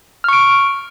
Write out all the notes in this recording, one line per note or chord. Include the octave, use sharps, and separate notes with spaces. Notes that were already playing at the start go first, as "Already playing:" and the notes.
C#6 F6 D7